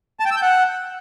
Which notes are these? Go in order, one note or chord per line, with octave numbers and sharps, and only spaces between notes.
A5
G5
E6
G6
F#5